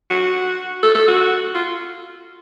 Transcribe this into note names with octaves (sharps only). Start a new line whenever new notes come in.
F#4
A4
A4
F#4
F4